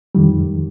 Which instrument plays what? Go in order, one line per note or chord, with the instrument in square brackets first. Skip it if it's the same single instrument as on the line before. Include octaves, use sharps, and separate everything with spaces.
[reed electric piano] F2 D#3 G3